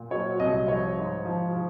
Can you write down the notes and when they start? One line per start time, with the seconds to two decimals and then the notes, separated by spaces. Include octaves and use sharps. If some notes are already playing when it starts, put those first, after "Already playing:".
Already playing: A#2
0.11 F#3 C#5
0.39 C2 D#5
0.68 F3 C#5
0.97 G#2
1.25 F3
1.54 F3